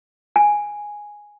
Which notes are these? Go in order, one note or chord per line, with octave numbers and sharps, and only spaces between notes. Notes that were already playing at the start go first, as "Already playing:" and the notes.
G#5